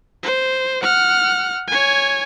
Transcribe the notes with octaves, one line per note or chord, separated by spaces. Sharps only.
C5
F#5 F6
C#5 G#5